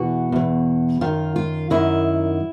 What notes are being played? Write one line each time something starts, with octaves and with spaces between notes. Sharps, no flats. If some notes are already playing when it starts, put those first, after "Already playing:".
Already playing: E2 B2 F#4
E2 B2
F#2 D#3 F4
F4
F#2 D#3 E4